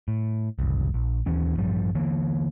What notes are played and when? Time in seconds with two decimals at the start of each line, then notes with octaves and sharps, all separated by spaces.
0.08 A2
0.59 F#1 C2
0.94 A#1
1.26 D#2 E3 C#4
1.57 A1 G2 F3 G3
1.95 D3 E3 A#3